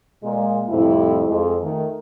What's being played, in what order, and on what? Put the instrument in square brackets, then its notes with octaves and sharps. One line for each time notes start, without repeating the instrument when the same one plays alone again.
[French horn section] A#2 G#3
F2 A2 C3 G3 E4
F2 G#3
D#3 A3